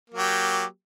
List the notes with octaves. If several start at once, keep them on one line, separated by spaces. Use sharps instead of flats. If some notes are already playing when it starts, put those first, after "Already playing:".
F#3 A#3 G4